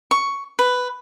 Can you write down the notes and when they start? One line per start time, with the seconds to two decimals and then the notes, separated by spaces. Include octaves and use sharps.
0.11 C#6
0.59 B4